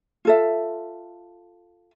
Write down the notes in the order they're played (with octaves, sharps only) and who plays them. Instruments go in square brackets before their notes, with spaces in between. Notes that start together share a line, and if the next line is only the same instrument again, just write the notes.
[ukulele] F4 A4 E5